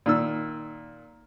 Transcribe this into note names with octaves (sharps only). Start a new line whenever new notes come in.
A#2 D#3 E6